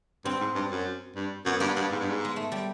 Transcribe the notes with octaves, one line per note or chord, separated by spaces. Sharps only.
G2 C4
G#2
G2
F#2
G2
F#2 B3
G2 A#3
G2 B3
G#2
G2
G#2
G#3
A3
G3